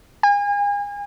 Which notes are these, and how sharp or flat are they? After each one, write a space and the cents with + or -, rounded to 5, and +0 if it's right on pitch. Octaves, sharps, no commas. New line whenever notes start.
G#5 -35